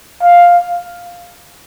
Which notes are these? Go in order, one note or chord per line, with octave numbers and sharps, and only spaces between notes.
F5